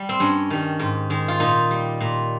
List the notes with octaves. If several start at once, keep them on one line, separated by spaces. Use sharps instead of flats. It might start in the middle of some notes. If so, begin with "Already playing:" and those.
Already playing: G3
C4
G2 C#4
D#3 G3
G#2
D#3 G#3
F4
A#2 D#4
G3
A#2